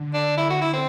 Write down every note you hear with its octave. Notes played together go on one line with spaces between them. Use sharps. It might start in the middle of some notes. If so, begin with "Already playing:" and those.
Already playing: D3
D4
E4
F#4
E4
C4